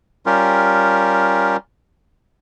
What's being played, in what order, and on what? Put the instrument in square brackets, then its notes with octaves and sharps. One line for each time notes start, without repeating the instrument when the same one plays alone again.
[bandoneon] G3 C#4 F4 G4 A#4